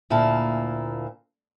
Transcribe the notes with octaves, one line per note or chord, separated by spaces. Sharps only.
D2 A#2 A#3 E4 A5